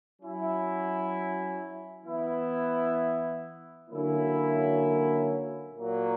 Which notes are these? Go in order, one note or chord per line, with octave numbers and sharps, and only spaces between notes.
F#3 C#4 E4
E3 B3 E4
D3 F#3 A#3 C#4 E4
A#2 F#3 A#3